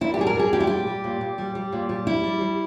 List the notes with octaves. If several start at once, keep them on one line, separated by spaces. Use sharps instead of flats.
A#2 E4
G4
G3 G#4
A#4
G3 G#4
A#2 G4
E4
G3 G4
G3
A#2
A#2
G3
G3
A#2
G3
G3 E4
G3
G3